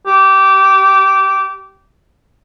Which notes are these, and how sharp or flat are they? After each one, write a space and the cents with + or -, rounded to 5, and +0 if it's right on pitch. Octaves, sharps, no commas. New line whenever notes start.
G4 -20